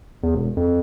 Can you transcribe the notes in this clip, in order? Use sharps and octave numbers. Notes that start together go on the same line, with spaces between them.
E2
E1
F2